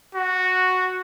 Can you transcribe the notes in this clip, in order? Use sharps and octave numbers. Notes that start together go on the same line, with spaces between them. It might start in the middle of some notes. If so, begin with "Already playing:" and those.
F#4